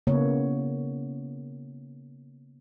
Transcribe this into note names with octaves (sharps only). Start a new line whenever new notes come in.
C#3 A#3 B3 E4 C#5